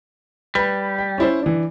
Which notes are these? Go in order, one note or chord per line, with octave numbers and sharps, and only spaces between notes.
G3 B4 B5
G5
C#4 E4 C5
E3 D4